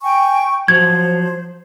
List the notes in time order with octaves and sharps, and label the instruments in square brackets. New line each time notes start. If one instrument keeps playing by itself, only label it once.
[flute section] G5 G#5 C#6
[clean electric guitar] F3 F#3 [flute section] C5 [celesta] G#6